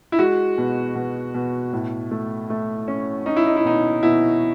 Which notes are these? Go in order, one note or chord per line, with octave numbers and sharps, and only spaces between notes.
E4
G#3 F#4
B2
B2
B2
A2
A3
A3
C#4
C#4 D#4
E4
D#4
E4
B2 D#4
B2 E4